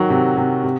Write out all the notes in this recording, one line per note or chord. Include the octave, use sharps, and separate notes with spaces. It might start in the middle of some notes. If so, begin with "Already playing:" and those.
Already playing: D#3 F#3 F#4
C3
C3
C3